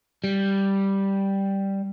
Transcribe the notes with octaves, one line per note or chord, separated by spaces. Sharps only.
G3